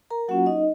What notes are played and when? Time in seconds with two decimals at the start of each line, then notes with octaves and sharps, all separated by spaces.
0.10 A#4 A#5
0.28 F#3 A#3 C#4 F4 F#4 F#5
0.46 D#4 D#5